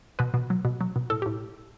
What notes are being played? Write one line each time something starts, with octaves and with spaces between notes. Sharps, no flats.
B2 B4
B2
F#3
B2
F#3
B2
A2 A4
G4
A2